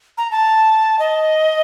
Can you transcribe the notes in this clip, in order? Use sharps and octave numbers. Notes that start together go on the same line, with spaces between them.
A#5
A5
D#5